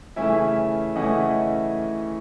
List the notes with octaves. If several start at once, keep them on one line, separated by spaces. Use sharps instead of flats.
C#3 E3 A3 C#4 E4 E5 G#5
C#3 E3 A3 C#4 E4 D#5 F#5